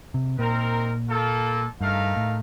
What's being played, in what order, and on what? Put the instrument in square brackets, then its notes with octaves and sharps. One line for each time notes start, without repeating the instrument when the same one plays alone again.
[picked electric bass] C3
[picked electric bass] A#2 [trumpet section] C4 D#4 A#4
[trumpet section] A#3 F4 A4
[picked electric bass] G2 [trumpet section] A3 D#4 A#4 F5
[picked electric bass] A2